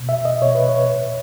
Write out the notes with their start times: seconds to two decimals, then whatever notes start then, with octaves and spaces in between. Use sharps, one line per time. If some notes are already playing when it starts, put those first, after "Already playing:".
Already playing: B2
0.09 E5
0.25 D#5
0.41 B2 C#5
0.55 B4
0.69 C#5
0.90 A#2